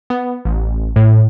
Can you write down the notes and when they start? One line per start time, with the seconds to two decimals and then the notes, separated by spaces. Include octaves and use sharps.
0.10 B3
0.45 A1
0.96 A2